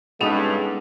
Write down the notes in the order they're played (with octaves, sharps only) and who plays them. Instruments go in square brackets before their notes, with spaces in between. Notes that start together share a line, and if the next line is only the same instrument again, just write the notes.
[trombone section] C#2 G2 [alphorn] G#3 [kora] B3 A4 B4 [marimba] C#4 D#4